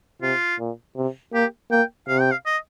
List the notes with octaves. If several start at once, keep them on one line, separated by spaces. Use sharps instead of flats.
C3 F4
A#2
C3
A#3 G4
A#3 G5
C3 F5
G5
F5
D#5